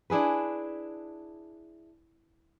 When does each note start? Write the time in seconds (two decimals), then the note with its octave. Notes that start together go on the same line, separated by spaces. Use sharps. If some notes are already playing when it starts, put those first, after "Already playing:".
0.10 D4 E4 G#4 B4